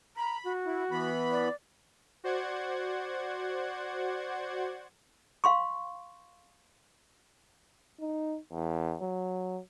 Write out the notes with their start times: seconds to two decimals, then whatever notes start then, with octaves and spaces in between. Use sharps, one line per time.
0.17 A#5 B5
0.44 F#4
0.66 E4
0.91 E3 B3 B5
1.31 D5
2.24 F#4 C5 D5 F#5 G#6
5.44 F5 C6 C#6
8.00 D#4
8.52 E2
9.02 F#3